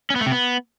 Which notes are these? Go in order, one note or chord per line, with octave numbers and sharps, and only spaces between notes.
C#4
B3
A3
C3
B3